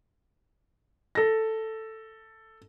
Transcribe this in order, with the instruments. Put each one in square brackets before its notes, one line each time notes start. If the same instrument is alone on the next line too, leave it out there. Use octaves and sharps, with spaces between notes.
[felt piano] A4 A#6